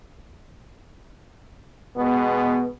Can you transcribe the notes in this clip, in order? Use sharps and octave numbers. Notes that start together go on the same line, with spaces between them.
B2 G#3 B3